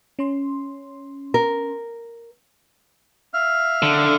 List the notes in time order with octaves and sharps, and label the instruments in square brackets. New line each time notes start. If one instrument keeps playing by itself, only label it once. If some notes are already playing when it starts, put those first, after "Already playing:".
[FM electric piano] C#4 C6
[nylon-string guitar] A#4
[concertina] E5 F5 F6
[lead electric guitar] D3